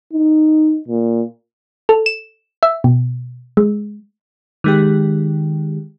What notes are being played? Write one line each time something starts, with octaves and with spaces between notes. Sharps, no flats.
D#4
A#2
A4
E7
E5
B2
G#3
D#3 G#3 G4